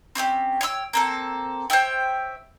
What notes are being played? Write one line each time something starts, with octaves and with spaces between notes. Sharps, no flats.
C4 C#4 E4 G4
C#5 G5 C6 E6
A#3 C4 A4
C5 C#5 E5 G5